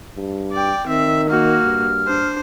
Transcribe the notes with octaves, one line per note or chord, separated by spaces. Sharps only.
G2
D5 G5
D#3 C4 E5
A#3 F#4 F6
G2
D4 C5